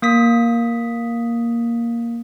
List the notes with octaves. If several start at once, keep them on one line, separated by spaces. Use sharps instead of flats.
A#3 D#6 B6